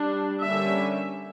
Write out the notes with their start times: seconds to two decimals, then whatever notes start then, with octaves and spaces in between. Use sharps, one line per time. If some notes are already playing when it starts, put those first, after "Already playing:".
Already playing: G3 D4
0.43 D3 G3 A#3 C#4 E5